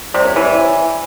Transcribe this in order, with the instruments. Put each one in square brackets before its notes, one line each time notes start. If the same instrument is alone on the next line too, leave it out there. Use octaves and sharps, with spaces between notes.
[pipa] C3 [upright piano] D5
[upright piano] C#5
[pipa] E3 [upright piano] C#5
[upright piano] D5